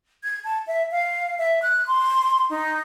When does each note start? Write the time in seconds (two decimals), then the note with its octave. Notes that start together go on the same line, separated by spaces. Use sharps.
0.24 G#6
0.44 A5
0.67 E5
0.91 F5
1.38 E5
1.62 F#6
1.87 C6
2.50 D#4